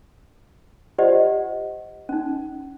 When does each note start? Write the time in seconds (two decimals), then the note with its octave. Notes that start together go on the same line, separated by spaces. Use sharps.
0.98 F4 G4 C5 D5 D#5 F#5
2.09 C#4 D#4